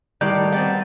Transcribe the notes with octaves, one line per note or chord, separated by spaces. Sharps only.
A2 D#3 G3 D5 G6
B3 C4 D5 G5